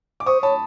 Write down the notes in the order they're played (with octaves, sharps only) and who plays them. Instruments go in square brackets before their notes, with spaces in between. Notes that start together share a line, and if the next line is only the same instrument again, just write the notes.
[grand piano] D6
[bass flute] C5 [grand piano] C#6 D#6
[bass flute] C#5 [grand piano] A5 B5